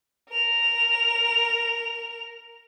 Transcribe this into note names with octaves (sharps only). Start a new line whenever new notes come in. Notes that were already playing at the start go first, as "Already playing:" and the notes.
A#4 F7